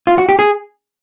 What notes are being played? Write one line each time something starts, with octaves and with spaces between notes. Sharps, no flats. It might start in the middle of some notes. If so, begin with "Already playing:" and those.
F4
F#4
G4
G#4